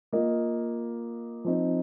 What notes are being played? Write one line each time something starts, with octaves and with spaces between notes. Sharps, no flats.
A#3 F4 D#5
F3 C4 D#4